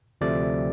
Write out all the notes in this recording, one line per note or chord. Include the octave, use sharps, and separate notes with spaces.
D2 C3 F3 A3 D5